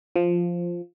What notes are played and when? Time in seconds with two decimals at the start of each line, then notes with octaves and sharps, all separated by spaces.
0.16 F3